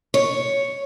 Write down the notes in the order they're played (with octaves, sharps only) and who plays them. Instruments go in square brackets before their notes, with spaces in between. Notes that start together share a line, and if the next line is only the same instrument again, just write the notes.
[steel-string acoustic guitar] C#5